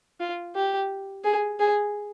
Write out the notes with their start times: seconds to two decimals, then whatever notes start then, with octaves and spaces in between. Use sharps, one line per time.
0.20 F4
0.55 G4
1.24 G#4
1.60 G#4